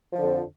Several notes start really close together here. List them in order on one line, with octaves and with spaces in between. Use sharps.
F3 D3 F2